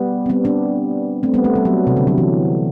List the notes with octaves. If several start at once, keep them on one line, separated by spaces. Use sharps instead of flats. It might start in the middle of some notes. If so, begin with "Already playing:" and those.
Already playing: G3 B3
C4
G3 B3
B3 D4
A3 C4
G3 B3
A3
G3
F#3
C3
D3
F#3
E3